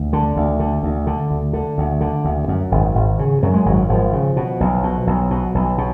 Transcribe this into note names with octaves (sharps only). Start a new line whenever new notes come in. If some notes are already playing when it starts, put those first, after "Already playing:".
Already playing: D2
D3
D2
D3
D2
D3
D2
D3
D2
D3
D2
F#2
G#1
G#1
C#3
F#2 F#3
G#3
G#1 F#3
G#1 F3
C#3
B2
B1
B2
B1
B2
B1
B2